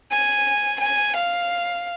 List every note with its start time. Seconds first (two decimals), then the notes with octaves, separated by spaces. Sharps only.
0.11 G#5
0.81 G#5
1.17 F5